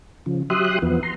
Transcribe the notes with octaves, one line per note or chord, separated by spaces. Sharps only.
C#3 F3
F#3 G4 E5 C6 D#6 F#6
E2 F3 B3
A#5 C6